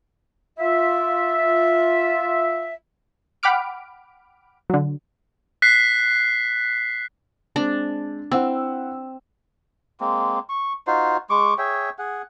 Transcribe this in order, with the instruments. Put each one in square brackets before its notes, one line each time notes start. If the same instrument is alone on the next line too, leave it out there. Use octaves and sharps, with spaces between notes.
[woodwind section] F4 E5
[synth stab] F#5 G5 B5 D6 F6 D7
D3 F#3
[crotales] F#6 B6 C7
[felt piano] G#3 C4 [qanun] D4
[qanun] C4 [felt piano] E4 F#5 E6
[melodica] G#3 A#3 C4
C#6
D#4 F4 F#4 C5
G#3 C#6 D6
G#4 C#5 E5 G5
G#4 F#5